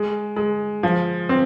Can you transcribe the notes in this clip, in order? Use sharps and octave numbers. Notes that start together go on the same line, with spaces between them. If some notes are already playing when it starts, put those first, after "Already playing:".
Already playing: G#3
G#3
F3
C4